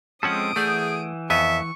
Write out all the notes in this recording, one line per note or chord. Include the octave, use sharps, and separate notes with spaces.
F3 G#3 C4 C#4 A4 F#5 D#6 D7
E3 A3 G#4 D5 F#5 G6
F2 B3 E5 G#5 C#6